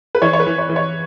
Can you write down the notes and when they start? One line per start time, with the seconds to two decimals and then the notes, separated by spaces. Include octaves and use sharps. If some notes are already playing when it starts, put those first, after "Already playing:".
0.15 B4
0.22 E3 C#5
0.33 C#5
0.40 B4
0.47 E3
0.58 C#5
0.69 E3
0.76 C#5